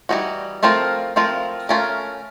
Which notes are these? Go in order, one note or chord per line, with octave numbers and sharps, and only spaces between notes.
E3 G3 A#3 D#4 F#4
F3 A3 C4 F4 A#4
F3 A3 C4 F4 A#4
A3 C#4 F4 A#4